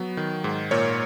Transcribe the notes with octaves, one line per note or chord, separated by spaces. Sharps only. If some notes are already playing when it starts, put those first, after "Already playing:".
Already playing: F#3 B3
D#3
G#2
A#2 A#4 C#5